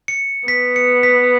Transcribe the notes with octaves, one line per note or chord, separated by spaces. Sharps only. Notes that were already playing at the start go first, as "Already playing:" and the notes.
C#7
B3 B6
C#7
B6